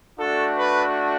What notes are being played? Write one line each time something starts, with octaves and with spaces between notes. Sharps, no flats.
A3 D4 F#4 A4
B4